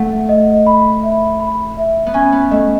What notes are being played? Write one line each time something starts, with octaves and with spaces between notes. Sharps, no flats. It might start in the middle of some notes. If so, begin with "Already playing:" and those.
Already playing: A3 F#5
D#5
B5
E5
B5
E5
B3
C#4 G#5
B3
A3 D#5